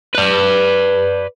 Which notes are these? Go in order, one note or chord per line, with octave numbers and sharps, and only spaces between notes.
B4 D5